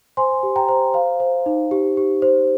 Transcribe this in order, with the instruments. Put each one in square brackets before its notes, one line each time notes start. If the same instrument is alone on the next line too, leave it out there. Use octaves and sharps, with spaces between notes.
[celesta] C5 G#5 C6
G4
G5 A#5
C5
C5 F5
C5
D#4
G4
G4
C5